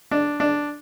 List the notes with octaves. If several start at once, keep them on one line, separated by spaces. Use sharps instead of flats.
D4
D4